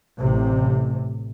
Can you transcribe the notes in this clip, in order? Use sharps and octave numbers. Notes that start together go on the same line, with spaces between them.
A1 C3